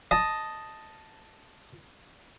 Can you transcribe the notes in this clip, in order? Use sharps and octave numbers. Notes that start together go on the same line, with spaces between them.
D#5 A5